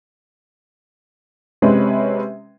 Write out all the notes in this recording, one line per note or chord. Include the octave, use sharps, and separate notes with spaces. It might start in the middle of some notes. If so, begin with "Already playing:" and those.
C3 G#3 C4 C#4 B4